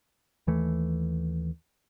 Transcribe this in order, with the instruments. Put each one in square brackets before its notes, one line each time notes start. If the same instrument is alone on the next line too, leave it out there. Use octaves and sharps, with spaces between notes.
[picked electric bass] D#2 E3 A3